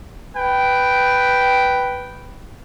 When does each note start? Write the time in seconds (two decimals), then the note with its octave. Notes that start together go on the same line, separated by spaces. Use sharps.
0.35 B4 G5